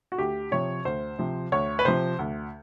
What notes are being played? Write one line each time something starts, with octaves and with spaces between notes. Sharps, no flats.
F#4
D2 G4
C3 F3 C#5
D2 C5
C3 F3
D2 C#5
B4
C3 F3 C5
D2